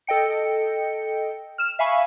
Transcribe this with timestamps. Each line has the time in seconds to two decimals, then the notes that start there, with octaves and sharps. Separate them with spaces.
0.07 A4 D#5 G5 C#7
1.58 F6 E7
1.79 E5 F5 G#5 B5 C#6